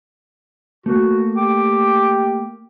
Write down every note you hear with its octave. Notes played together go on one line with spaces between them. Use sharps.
A3 A#3 F#4
G4 D6